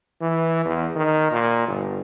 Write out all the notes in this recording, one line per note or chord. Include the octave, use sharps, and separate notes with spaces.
E3
E2
D#3
A#2
G1